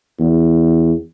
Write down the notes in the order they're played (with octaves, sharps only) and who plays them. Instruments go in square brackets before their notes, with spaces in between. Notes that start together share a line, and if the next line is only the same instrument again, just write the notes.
[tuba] E2